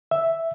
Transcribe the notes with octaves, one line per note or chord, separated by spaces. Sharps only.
E5